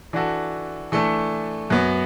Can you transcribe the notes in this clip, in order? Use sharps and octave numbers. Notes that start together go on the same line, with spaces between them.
E3 D4 F#4 A4
E3 A3 D4 A4
F#2 F#3 B3